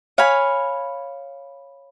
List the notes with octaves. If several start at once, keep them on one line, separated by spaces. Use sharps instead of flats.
C#5 F5 G#5 B5